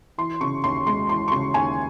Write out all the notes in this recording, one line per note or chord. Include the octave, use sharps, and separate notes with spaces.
E3 C6
C#3 C#6
D#2 C6
G#3 C6
E3 C6
C#6
C#3 C6
D#2 G#5